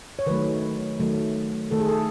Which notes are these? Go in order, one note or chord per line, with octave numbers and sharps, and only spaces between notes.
C#5
D#3 F#3 A3 B4
D#3 F#3 A3
D#3 A3 A4
G#4
A4